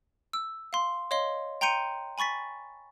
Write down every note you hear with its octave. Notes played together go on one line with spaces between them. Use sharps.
E6
F5 C6
C#5 D#5 F5 C6 G7
G5 A#5 C6 G6 C#7 D#7
G#5 B5 C#6 A6 B6